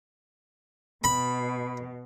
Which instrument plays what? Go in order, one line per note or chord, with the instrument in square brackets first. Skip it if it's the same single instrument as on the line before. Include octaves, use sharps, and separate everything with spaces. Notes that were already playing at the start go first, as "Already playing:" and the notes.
[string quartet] B2 [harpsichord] B5